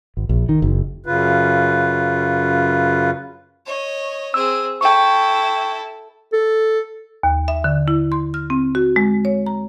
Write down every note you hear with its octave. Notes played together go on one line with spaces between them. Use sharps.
G#1
A#1
D#3
F#1
F#2 C#3 F4 B4
C#5 D#5
C4 G#4 E6
E4 A4 G5 C#6
A4
D#2
E5
D3
E4
C6
F6
C4
F#4
G#3
C#5
A#5